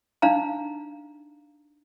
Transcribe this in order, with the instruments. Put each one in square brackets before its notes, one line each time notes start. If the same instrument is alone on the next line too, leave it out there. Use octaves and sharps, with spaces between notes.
[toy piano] D4 D#4 F5 A#5